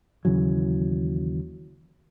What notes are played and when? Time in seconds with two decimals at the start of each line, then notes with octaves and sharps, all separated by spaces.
0.25 D#2 C#3 E3 F#3